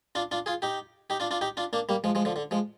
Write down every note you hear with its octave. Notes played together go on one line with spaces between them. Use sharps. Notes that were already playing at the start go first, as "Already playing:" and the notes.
D4 F4
D4 F4
F4 G#4
D#4 G4
D#4 G4
D4 F4
D4 F4
D#4 G4
D4 F4
A#3 D4
G3 A#3
F3 G#3
F3 G#3
D3 F3
D3
F3 G#3